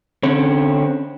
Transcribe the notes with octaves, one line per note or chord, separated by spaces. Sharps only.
D3 C4 C#4